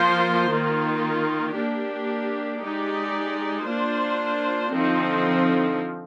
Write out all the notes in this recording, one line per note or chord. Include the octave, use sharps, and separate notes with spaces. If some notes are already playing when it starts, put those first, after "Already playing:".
Already playing: F3 A#3 F4 C5
D#3 A#3 F4
A#3 D4 G4
G#3 D#4 G4 D5
A#3 D4 F4 C5
D3 F3 C4 D#4